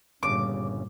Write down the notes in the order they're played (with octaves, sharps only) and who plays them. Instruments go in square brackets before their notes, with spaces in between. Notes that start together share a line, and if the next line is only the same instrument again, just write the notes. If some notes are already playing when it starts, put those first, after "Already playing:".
[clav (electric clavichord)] G1 C#3 [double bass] G2 A#2 [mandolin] D6